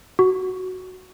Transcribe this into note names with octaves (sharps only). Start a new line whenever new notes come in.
F#4